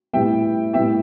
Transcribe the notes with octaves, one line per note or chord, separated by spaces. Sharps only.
A2 G3 B3 E5 G5
A2 G3 B3 E5 G5